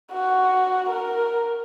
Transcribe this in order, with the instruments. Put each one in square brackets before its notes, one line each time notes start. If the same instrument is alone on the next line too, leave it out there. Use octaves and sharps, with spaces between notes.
[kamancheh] F#4
A#4